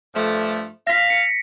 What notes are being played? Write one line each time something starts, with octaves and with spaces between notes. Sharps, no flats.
G2 F3 A3
F5 A#6 B6
C#7